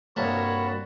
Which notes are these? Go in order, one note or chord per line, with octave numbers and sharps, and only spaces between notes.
C2 G2 A#3 F#4 C#5 A5 B5